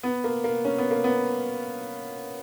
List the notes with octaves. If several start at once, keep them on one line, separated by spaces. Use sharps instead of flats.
B3
A#3
A#3
C#4
B3
A#3
B3